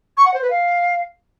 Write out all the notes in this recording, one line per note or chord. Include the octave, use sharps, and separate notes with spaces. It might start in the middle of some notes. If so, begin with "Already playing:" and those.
C#6
F#5
C5
B4
F5